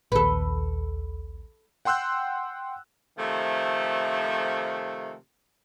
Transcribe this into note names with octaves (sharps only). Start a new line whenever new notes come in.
A#1 D#2 A4 B4
F#5 G5 C6 E6 F#6 G6
C3 D#3 F3 A3